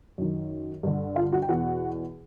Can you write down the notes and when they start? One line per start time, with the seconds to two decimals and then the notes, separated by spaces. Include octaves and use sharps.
0.18 F#2 D#3
0.83 G2 D3
1.16 F4 F5
1.32 F#4 F#5
1.42 G5
1.49 E2 B2 F#4 F#5